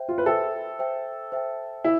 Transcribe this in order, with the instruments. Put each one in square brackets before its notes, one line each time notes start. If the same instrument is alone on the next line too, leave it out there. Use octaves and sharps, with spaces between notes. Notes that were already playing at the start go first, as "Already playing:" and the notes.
Already playing: [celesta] C5 E5 G5
[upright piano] F4
B4
[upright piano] A4 [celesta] C5 E5 G5
[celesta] C5 E5 G5
C5 E5 G5
[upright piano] E4